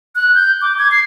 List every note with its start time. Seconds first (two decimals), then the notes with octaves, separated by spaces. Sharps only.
0.15 F#6
0.35 G6
0.62 D6
0.79 G#6
0.91 C7